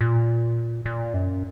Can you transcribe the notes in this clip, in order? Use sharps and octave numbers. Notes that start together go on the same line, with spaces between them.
A#2
A#2
F#2